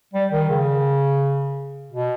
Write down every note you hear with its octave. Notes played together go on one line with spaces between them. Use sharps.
G3
D#3
C#3
B2